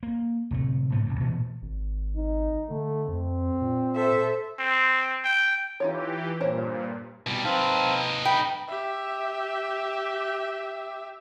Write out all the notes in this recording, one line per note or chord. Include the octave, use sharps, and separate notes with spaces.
A#3
D1 C3 A3
G#2 C#3 A3 A#3
C2 F#2 C3
A#2 E3 A3 B3
G#1
D#4
D3 A3
F2 C4
A#2
A4 C5 E5
C4
G5
E3 D#4 F4 G4 C#5
G2 A#2 A#4 C5 C#5
B2 G3
C4 D#4 B4 F5 A5
G5 B5
G4 E5